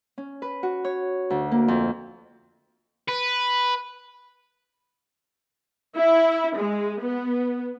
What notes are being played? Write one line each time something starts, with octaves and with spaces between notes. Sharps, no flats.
C#4
B4
F#4
C#5
D2
A#3
F2
B4
E4
G#3
B3